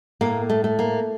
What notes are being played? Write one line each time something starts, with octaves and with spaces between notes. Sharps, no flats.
A2 A#3
A3
A3
A#3